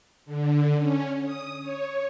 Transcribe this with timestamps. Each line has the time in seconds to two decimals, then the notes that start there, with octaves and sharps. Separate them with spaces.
0.26 D3
0.79 C#4
1.24 D#6
1.61 C#5